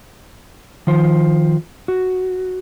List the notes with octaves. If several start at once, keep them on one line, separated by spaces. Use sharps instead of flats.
D#3 F3 C5
F#4